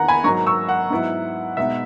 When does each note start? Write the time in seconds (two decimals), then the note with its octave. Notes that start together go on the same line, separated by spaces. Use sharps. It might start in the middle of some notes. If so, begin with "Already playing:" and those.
Already playing: E2 D#3 A#3 F#5 A#5
0.08 G#5 B5
0.24 G#2 F#3 A#3 A#5 C#6
0.46 C#6 E6
0.69 F#5
0.90 G#2 F#3 B3 E4
1.57 B2 G#3 B3 D#4 E5